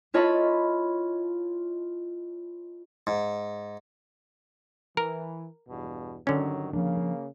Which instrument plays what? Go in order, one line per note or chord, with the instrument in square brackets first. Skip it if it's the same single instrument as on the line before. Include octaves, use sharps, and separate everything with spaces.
[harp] E4 F4 C#5 D#5 A5 B5
[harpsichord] G#2
[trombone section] E3 [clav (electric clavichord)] A#4
[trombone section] E2 G2 B2
[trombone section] G2 D#3 F#3 [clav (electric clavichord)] D3 C#4
[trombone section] C#3 A#3 [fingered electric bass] F3 D4